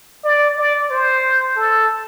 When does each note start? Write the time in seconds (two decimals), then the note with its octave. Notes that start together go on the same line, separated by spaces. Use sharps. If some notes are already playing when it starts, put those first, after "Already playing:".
0.24 D5
0.58 D5
0.90 C5
1.57 A4